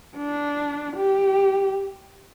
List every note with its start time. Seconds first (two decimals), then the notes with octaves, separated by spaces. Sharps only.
0.16 D4
0.97 G4